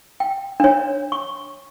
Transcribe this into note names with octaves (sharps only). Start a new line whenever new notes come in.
G5
D4 C#5
C#6